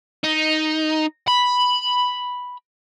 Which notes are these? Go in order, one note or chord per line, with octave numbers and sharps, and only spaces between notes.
D#4
B5